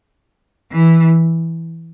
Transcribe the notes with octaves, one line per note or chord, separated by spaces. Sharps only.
E3